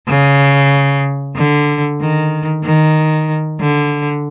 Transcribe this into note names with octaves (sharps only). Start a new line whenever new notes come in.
C#3
D3
D#3
D#3
D3